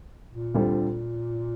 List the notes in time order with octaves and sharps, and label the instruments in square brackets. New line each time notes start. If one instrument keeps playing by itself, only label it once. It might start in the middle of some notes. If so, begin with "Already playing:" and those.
[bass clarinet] A#2
[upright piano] D2 D3 G3 C4 F4